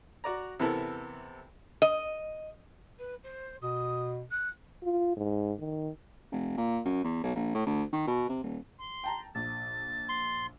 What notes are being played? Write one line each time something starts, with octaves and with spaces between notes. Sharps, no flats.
F#4 D5 A#5
C3 E3 B3 E4 A4 A#4
D#5
B4
C5
B2 D#6
F#6
F4
G#2
D#3
F1
A#2
F#2
E2
B1
A#1
A2
D2
D#3
B2
C3
D#1
C6
G5 A5 A#5
A#1 A6
C6